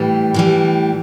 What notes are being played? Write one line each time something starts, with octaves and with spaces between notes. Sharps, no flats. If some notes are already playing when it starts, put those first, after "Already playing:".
Already playing: A2 E3 G3
A2 E3 G3